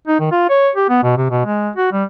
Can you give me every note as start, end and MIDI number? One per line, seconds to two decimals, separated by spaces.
0.08 0.19 63
0.20 0.29 51
0.32 0.48 65
0.50 0.70 73
0.76 0.89 67
0.89 0.99 59
1.03 1.14 47
1.17 1.28 48
1.31 1.42 47
1.46 1.70 56
1.76 1.89 66
1.92 2.04 55